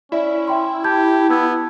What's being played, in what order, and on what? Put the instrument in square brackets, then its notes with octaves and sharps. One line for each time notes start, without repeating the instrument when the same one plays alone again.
[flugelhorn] C#4 [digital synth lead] E4 [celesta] D5 E5
[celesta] E5 G5 C6
[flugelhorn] G4 [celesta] A5 G6 G#6
[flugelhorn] B3 [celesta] A5 E6 G#6